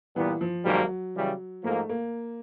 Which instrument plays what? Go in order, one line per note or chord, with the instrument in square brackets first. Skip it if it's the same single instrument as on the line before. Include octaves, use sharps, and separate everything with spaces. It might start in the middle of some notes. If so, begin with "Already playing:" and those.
[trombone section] A#2 G3 B3 [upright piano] E3
[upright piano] F3
[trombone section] G#1 G#2 D#3 G3 A#3 [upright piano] F#3
[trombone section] C#3 E3 G3
[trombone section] G#2 F3 A#3 [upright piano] A3
[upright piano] A#3